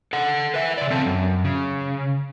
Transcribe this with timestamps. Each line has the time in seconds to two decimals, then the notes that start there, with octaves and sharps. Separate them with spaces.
0.13 A4 F#5
0.54 B4 E5
0.78 C#3 D5
0.91 C4 A4 A5
1.06 F#2
1.45 C#3